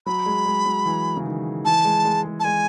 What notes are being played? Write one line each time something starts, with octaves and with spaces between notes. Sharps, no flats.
F#3 B5
G#3
G#3
F#3
E3
C#3
D#3
E3 A5
G#3
G#3
G#3
A5
G#3 G#5